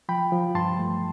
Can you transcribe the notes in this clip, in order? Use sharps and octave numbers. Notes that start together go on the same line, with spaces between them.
F3 G5 B5
F3
G2 A5 C6
A3